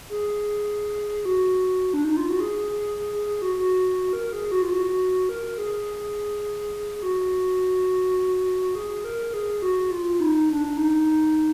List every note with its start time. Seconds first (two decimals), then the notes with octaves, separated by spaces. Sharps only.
0.09 G#4
1.25 F#4
1.93 D4
2.05 D#4
2.17 F4
2.29 F#4
2.40 G#4
2.70 G#4
2.98 G#4
3.13 G#4
3.26 G#4
3.42 F#4
3.56 F#4
4.13 A#4
4.33 G#4
4.52 F#4
4.62 F4
4.71 F#4
5.29 A#4
5.58 G#4
7.03 F#4
8.75 G#4
9.04 A#4
9.34 G#4
9.62 F#4
9.91 F4
10.20 D#4
10.49 D4
10.77 D#4